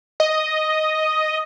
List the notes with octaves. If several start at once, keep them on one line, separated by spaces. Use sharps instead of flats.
D#5